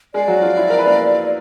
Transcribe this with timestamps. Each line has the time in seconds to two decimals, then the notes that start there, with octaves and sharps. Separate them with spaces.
0.14 G#3 G#4 D5
0.28 F#3 F#4
0.42 F3 F4
0.57 E4
0.70 A#4
0.79 B4
0.87 A#3 A#4